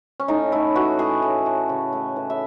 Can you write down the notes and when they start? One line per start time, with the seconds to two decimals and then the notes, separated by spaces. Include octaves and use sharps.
0.20 C#4
0.28 A2 D#4
0.52 A3 E4
0.75 E3 F#4
0.99 A2 G#4
1.22 A2
1.46 A3
1.69 C#3
1.93 A3
2.16 E3
2.30 E5